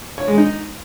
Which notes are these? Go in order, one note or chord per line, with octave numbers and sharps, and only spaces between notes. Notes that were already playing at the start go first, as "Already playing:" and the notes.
C#5
G#3
D#4